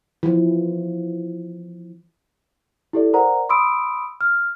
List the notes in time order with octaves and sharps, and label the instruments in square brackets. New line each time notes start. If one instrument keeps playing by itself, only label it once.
[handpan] E3 F3
[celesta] E4 G4 A4 D5
A#4 C5 D5 F#5 A#5
B5 C6 D#6 E6 D7
F6